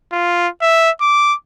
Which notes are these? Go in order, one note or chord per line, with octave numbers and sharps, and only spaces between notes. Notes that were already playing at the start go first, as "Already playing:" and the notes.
F4
E5
D6